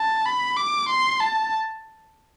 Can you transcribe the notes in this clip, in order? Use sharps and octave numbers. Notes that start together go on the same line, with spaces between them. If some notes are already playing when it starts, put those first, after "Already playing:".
Already playing: A5
B5
D6
C6
A5